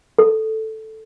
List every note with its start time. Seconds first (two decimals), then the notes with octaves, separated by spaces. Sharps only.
0.19 A4